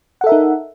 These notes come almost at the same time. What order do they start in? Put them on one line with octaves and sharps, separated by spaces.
F#5 A4 E5 A#4 D#4